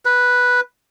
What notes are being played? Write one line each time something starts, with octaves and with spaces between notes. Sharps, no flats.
B4